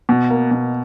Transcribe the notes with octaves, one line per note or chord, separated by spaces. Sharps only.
B2
A#3
B2